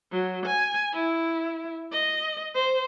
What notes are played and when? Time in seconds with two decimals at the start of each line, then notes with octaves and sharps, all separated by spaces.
0.12 F#3
0.46 G#5
0.93 E4
1.92 D#5
2.55 C5